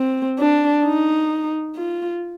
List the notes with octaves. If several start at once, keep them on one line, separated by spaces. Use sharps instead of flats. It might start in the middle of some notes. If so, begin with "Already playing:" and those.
Already playing: C4
D4
D#4
F4